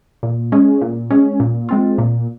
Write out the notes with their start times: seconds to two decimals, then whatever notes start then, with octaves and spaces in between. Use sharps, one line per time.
0.23 A#2
0.52 G#3 C#4
0.81 A#2
1.11 G#3 C#4
1.40 A#2
1.69 G#3 C4 F4
1.98 A#2